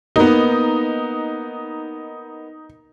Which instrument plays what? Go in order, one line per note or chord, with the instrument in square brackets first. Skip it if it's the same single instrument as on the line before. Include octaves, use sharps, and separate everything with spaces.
[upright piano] A#3 B3 [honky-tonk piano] D#4